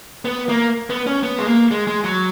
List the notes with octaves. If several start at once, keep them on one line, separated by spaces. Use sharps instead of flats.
B3
A#3
B3
C#4
B3
G#3
A#3
G#3
G#3
F#3